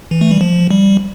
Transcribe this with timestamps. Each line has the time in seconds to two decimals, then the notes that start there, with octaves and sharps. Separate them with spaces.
0.11 E3
0.21 A3
0.31 G3
0.41 F3
0.71 G3